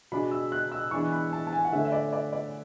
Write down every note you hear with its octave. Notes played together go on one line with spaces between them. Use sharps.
B2 G#3 D4 B5
E6
F#6
E6
E3 G#3 B3 D4 C#6
B5
A5
A5
G#5
F#5
D3 A3 C#4 E5
E5
D5
D5
D5